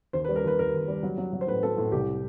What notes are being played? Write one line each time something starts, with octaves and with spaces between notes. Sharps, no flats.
D#2 C5
B4
G3
A#4
D#2 B4
D#2 A#4
D#2
G3
F#3
F#3
F#3
C5
A2 B4
F#3 A4
A2
C2 G4